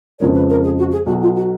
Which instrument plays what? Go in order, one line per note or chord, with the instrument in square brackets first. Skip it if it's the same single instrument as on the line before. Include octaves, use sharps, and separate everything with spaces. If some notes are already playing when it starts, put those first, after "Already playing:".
[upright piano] F2 C#3 F3 G#3 [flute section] A#4 C#5
[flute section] B4
A#4
G#4
F#4
G#4
[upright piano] B1 B2 F#3 [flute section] F#4
[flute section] F4
F#4